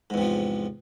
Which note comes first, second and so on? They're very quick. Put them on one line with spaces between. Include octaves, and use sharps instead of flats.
G#2 E2 C3 F3